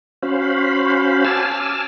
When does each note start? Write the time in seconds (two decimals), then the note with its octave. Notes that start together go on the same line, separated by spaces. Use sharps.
0.23 C#4 F#4 C5 F5 B5
1.25 G#5 A5 D6 E6 F6